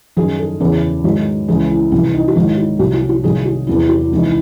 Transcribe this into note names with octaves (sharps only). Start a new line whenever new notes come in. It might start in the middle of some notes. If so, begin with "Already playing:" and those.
F#2 D#3 F#3 G#4
A4
E2 C#3 E3
G#2 D#3 F#3
C#2 C#3 E3 G#4
E4
C2 C3 E3 E4
D#4
F#4
G#2 D#3 F#3 E4
F#4
C2 C3 F#3 F#4
F#4
F#4
C2 C3 D#3 F#3 G#4
F#4
E2 C3 F#3 E4
F#4
E4
C#2 C3 E3 D#4
E4